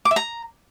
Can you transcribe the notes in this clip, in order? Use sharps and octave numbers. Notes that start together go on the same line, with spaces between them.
D6
E5
A#5